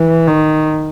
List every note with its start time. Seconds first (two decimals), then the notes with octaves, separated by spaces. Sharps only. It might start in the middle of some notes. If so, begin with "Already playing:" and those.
Already playing: E3
0.27 D#3